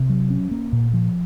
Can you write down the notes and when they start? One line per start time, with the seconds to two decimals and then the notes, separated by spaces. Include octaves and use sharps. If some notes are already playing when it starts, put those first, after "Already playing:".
Already playing: C3
0.10 F#3
0.30 C#4
0.51 A#3
0.73 A#2
0.94 F3